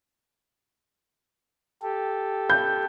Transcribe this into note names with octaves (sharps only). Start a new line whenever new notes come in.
G4 A4
G6